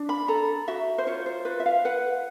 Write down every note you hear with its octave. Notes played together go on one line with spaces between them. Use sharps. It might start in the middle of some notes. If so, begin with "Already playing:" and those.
Already playing: D4
B5
A4 A#5
F#4 E5
C5
F4 C#5
C5
F4 B4
E5
F5
B4 F#5